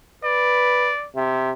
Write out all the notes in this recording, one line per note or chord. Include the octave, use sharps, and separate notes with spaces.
B4 D5
C3